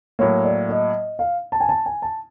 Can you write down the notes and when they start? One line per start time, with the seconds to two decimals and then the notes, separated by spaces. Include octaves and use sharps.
0.19 A2 F#3 A#3 C#5
0.44 D5
0.69 D#5
1.19 F5
1.52 A5
1.60 G#5
1.69 A5
1.86 G#5
2.02 A5